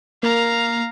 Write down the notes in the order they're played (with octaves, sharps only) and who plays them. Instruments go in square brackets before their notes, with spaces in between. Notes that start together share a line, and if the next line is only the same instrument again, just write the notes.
[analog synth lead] A#3 [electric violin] F5 A#5